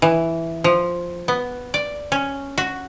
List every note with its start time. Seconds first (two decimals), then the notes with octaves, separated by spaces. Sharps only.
0.02 E3
0.64 F3
1.28 B3
1.74 D5
2.12 C#4
2.58 F#4